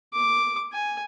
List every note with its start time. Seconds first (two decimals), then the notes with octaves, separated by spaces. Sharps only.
0.14 D6
0.73 G#5